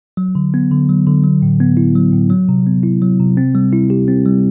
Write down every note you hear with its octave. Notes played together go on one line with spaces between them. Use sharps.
F#3
D3
B3
D3
F#3
D3
F#3
A2
B3
E4
F#3
A2
F#3
C3
B3
E4
F#3
C3
C4
G3
E4
G4
C4
G3